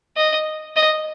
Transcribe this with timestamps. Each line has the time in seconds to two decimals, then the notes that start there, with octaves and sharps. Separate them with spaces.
0.17 D#5
0.76 D#5